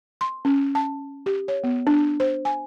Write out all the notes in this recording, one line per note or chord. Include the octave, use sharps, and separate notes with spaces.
C6
C#4
A5
G4
C#5
B3
D4
C5
G#5